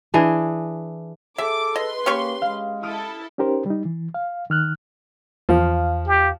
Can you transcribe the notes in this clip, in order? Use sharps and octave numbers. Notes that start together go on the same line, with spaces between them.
E3 D4 G#4
G#4 A4 E5 D6
B4 D#5 C6
A#3 C#4 G4 C#6
G#3 F5
E4 A4 D#6 F6 D7
C#4 D#4 G4 A#4 C5
G3 D#4
E3
F5
D#3 F6 F#6
E2 F3 F5
G4